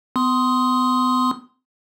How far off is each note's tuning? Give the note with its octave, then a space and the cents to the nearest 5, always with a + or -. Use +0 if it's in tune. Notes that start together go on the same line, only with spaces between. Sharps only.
B3 +35 C6 -5 D#6 +10